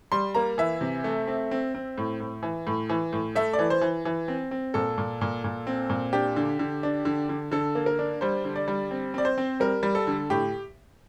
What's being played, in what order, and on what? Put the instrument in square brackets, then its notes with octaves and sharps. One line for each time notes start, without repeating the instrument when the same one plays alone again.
[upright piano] G3 C6
A#3 A#5
E3 E5
C3
A3
C4
C4
C4
A2
A2
E3
A2
E3
A2
A3 E5
D5
E3
C5
E3
E3
C4
C4
A#2 A4
A#2
A#2
A#2
C4
A#2
D4 G4
D3
D3
D4
D3
D3
D3 A4
A#3
A#4
D4
G3 C5
D3
D5
G3
C4
C4 D5
C5
C4
G3 A#4
G3
A4
D3
A2 G4